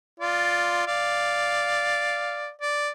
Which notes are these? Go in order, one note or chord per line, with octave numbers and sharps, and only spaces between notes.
F4 D5
D5 F5
D5